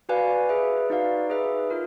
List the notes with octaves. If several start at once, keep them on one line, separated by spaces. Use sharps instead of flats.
F#4 B4 D5 F5 G#5
G#4 B4 E5
D#4 F#4 B4 D5 F5
G#4 B4 E5
F4 A#4